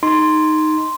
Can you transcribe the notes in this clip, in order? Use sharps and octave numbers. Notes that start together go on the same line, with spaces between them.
D#4 C6